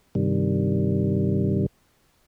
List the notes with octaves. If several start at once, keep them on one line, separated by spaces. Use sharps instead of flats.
G2 C3 D#3 G3